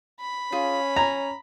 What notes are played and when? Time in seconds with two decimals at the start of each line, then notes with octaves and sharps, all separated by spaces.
0.20 B5
0.52 C#4 F4 G#4
0.96 G#5 A#5